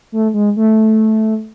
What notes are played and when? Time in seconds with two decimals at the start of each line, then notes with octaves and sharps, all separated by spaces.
0.12 A3
0.34 G#3
0.57 A3